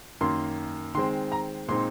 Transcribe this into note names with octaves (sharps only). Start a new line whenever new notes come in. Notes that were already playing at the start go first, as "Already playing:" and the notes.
F#2 D#3 A#3 C6
D#3 G#3 C4 C6
A#5
A#2 G#3 C4 D#4 C6